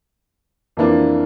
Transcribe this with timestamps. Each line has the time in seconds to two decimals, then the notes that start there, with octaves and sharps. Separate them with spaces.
0.77 F2 E3 A#3 D4 F4